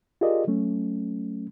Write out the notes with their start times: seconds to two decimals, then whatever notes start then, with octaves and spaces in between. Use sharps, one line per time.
0.21 F4 G4 G#4 A#4 D5 D#5
0.47 F#3 A3 C#4